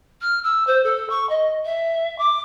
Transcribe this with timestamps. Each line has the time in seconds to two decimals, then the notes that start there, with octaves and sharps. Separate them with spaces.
0.21 F6
0.43 E6
0.67 C5
0.84 A4
1.10 C#6
1.29 D#5
1.65 E5
2.18 D6